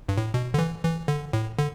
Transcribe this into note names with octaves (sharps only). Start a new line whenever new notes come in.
G2
A2
B2
D3
E3
E3
D3
A2
D3